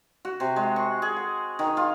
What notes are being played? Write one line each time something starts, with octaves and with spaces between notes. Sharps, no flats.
F#4
C3
G#3
C#6
G#4
F#5
D#3
F4